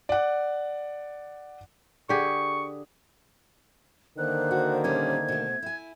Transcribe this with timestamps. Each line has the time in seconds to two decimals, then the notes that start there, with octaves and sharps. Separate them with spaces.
0.09 D5 F#5
2.09 D3 G4 G#4 C#6
4.18 D3 D#3 A#3 C5 F#6
4.51 F#4
4.84 A#2 G3 C#4 G#6
5.28 B2 A3
5.62 E4 G#5